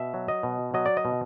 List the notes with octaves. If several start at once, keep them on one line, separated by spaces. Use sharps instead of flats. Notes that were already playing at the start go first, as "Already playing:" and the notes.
Already playing: B2 E5
F#3
D#5
B2
F#3 D#5
D5
D#5
B2